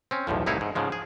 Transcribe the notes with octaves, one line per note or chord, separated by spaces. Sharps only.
C4 C#4
B1 E2 A2 F3
C2 A2 D#4 E4 C#5 F5
G#2
G#2 C#3 F3 G#3
G#4